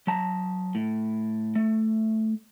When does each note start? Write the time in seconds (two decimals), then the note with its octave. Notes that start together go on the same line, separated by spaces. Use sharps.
0.07 F#3 A5 A#5
0.75 A2
1.55 A3